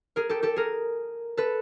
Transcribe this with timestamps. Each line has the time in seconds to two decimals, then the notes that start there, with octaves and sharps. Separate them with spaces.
0.16 G#4 A#4
0.29 G4 A4
0.43 G4 A4
0.56 G#4 A#4
1.37 A4 B4